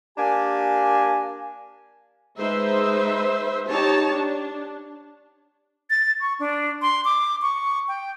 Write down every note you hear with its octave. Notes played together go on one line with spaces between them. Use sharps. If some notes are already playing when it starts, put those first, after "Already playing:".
A#3 D4 G4 G#5
G#3 D#4 B4 C5 E5
D#4 G4 C#5 A5
D4
A6
C#6
D4
C6
D6
C#6
G5